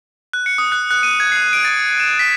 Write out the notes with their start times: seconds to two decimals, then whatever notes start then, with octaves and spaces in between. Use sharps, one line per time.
0.33 F#6
0.46 C#7
0.58 D#6
0.72 F#6
0.91 F#6
1.03 D#7
1.20 G#6
1.32 C7
1.53 D7
1.65 A6
2.00 E7
2.19 B6